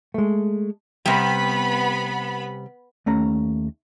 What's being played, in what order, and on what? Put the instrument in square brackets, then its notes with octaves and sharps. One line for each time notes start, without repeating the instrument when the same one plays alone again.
[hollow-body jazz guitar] G#3 A3
[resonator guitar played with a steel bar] C3 G3 [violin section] B3 B5
[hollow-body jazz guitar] D#2 A3 C#4 A#5